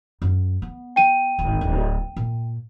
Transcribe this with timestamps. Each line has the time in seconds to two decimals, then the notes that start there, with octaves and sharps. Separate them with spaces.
0.22 F#2
0.62 B3
0.96 G5 D#7
1.39 D1 G#1
1.61 D1
2.16 A#2